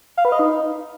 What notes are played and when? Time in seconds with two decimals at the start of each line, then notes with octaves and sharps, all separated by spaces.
0.17 F5
0.25 B4
0.32 D#5
0.39 D#4